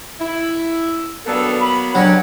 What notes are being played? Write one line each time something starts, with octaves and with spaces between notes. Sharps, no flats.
E4
G2 F#3 A#3 B3 A4
B5
C#2 F#3 C#4 D4 G4 C#5